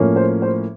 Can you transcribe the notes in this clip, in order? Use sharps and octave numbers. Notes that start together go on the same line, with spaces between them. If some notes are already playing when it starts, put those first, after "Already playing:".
Already playing: A2 F3 A#3 C#4
C5
C5